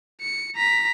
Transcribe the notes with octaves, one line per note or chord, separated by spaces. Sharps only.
C#7
A#5 B6